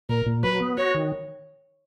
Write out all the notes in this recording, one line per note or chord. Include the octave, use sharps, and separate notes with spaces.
A#2 A#4
A#2
F#3 B4
B3
F#4 C#5
D#3